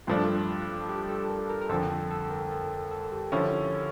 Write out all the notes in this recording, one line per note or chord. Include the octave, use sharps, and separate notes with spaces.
G2 F3 A3 D4 F4
G4
A4
A#4
A#4
A#4
F2 D3 F3 A4
A4
A4
A#4
A4
A4
A4
G4
D3 F3 C#4 E4